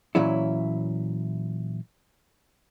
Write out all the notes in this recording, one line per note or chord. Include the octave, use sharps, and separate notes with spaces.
A#2 E3 F#3 C#4 E4